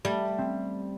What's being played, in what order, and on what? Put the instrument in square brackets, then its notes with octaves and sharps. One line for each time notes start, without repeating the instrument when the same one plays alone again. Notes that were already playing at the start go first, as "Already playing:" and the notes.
[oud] G3 [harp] A3
[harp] C4